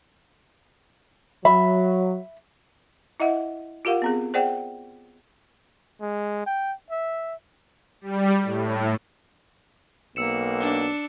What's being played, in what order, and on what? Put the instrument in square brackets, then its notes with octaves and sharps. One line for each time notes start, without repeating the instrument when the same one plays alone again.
[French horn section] F#3 [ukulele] E5 B5
[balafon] E4 D#5 E5 F#5
F4 G4 A#4 F5 F#5
B3 C4 G#4
G#4 C5 D5 F#5 G5
[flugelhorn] G#3
G5
E5
[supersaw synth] G3
A2
[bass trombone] B1 [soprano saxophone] A#3 [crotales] E6 C#7 E7
[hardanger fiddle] D4